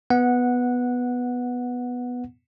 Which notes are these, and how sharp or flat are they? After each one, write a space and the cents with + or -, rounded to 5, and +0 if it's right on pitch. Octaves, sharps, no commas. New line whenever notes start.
B3 +0 F#5 -10